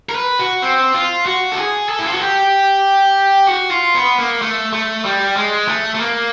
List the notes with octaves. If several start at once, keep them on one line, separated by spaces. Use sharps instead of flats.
A#4
B4
F#4
C4
F4
F#4
A4
G#4
A4
E4
F4
F#4
G4
F#4
F4
B3
A#3
A3
A3
G3
G#3
A3
A3
A#3